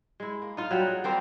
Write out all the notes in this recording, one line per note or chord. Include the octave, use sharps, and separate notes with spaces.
G#3 E4
A#3
D#4 F4
F#3 G3 F#5
G#4
G3 A#3 C4 F4